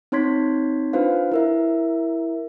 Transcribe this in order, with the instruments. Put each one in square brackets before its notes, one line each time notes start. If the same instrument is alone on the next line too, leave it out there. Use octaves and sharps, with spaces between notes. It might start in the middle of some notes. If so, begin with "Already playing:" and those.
[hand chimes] C4 D#4 C#5 C6 G#6 B6
D4 F4 B4 C5 F5
E4 A#4 E5